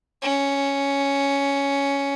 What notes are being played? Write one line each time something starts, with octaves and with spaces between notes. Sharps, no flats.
C#4